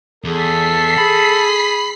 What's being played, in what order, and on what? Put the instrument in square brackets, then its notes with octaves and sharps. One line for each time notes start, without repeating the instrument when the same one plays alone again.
[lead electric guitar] E2 [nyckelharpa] G#4 [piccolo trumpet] A4 [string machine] B6 C7
[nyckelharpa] G#4 [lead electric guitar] B5